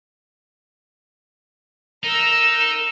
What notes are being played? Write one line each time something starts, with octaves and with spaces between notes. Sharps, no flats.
D#4 A#4 E6